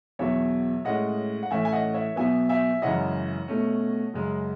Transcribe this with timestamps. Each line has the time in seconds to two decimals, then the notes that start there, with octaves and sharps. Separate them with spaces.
0.19 E2 B2 F#3 C#5 E5
0.85 A2 G#3 C#4 D#5 F#5
1.43 F#5
1.51 A2 E3 A3 C#4 E5 G#5
1.65 G#5
1.72 D#5 F#5
1.94 C#5 E5
2.16 B2 F#3 B3 E5 G#5
2.49 E5 G#5
2.82 F#2 C#3 E3 G#3 C#4 D#5 F#5
3.48 B2 A3 C#4
4.14 F#2 C#3 G#3